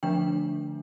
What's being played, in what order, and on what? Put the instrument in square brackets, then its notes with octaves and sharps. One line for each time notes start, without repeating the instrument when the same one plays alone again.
[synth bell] D3 F3 A3 D4 G5